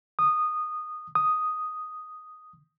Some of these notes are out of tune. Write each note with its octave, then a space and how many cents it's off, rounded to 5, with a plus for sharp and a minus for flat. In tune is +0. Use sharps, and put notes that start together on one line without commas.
D#6 -15
D#6 +0